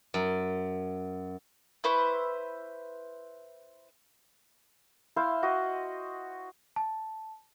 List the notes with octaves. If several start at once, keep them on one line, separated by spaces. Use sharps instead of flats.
F#2
E4 B4 C5 C#6
E4 C5 F5
F#4 D#5
A5